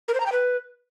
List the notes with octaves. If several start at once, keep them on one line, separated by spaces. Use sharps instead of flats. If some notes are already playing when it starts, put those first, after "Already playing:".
A#4
C5
A#5
G5
B4